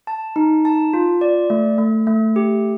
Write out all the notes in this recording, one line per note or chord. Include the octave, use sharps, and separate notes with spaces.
A5
D#4
A5
F4
D5
A3
A3
A3
G4